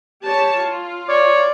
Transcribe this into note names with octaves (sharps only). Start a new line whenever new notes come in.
G4 C#5 A5
F4
C#5 D5